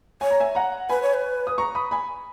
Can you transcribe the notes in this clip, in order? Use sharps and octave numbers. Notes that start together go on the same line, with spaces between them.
C#5 G#5
A#5
E5 G#5
F#5 A#5
B4 G#5 B5
C#5
B4
D#6
A#5 C#6
B5 D#6
G#5 B5